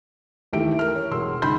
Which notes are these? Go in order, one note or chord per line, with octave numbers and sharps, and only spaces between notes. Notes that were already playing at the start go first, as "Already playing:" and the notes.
D#2 E3 A3 G4 E5 D7
A#4 F6
C#5
E1 B2 C6 E6
C#2 D#3 B5 C6 G6